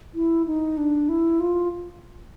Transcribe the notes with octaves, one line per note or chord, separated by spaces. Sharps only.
E4
D#4
D4
E4
F4